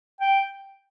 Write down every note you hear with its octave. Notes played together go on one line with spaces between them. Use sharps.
G5